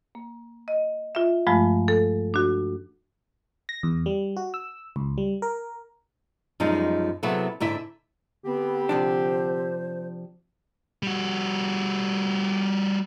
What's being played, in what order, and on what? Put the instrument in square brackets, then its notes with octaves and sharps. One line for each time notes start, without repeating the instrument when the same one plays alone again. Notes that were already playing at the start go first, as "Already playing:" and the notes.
[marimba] A#3
D#5
F4 E5
G2 F3 G#3 A3 F4
A4
D4 F#4
[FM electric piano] A#6
E2
G3
F#4
E6
C#2
G3
A#4
[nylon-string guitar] F#2 F3 G3 G#3 D#4
C3 F#3 B3 E4 G#4 A4
G#2 D3 E4 E5
[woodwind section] D3 C4 G4 [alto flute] B3
[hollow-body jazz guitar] C3 F3 D4 [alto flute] C5
[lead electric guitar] G3 F#4